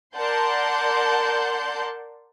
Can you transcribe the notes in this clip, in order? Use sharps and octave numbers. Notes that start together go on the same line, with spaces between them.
A#4 D5 F#5 A5 C6 G6